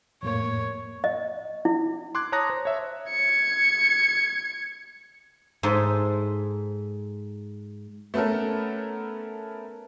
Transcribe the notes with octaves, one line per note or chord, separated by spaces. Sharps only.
F2 A2 A#3 C#5
D#5
E4
C6 D6 F#6 G#6
C#5 A5 A#5 D#6 F#6 A#6
C5
C#5 E5
G#6 C#7
G#2 D#4 A4 E5 C6
A3 B3 C#4 A4 A#4